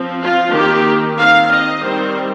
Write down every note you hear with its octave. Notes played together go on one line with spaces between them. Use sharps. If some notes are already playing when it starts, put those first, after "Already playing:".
Already playing: F3 C4
F4
D#3 A#3 G4
D#3 C4 F5
D#5
D#3 G3 C4 C5